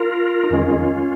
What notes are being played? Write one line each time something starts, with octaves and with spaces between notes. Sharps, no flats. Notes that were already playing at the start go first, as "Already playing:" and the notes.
Already playing: F4 A#4
D#4
F2 D#3 G#3 C#4 F4